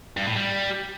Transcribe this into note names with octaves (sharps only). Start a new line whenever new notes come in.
G2
A2
G3